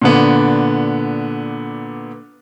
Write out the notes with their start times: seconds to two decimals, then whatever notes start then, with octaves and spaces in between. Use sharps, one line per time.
0.02 A#2 D3 B3